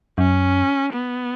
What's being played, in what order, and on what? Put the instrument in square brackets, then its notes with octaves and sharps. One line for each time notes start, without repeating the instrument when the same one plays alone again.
[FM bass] F#2 [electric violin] C#4
[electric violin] B3